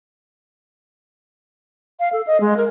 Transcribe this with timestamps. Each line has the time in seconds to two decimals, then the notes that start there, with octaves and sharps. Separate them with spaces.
2.00 F5
2.13 A4
2.27 D#5
2.41 G#3
2.57 A#4